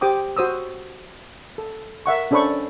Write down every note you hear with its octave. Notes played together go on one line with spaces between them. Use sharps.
G4 C5 G5 D6 D#6
F#4 C5 D#6 E6
A4
A#4 E5 F#5 C#6
C#4 D4 A4 C5 B5 C#6